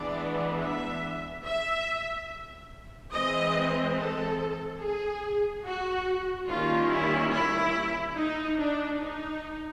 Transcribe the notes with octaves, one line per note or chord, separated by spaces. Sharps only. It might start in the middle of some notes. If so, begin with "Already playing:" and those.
Already playing: E3 G#3 B3 D4 D5
E5
E5
E3 G#3 C4 D#5
A4
G#4
F#4
D#3 G3 A#3 C#4 F4
E4
E4
D#4
D4
D#4